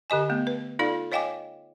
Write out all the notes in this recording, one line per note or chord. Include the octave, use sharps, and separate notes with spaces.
D3 G4 D#5 G#5
A3 B3
B4
D#4 F4 A4 D5 F5
C#5 D#5 F5 G5 G#5 D6